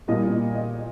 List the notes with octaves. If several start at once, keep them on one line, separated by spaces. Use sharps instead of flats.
A#2 G3 D#5
D#5